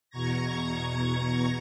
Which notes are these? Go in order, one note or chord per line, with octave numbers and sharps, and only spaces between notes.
E2 B2 A#5 C#6 G#6 A#6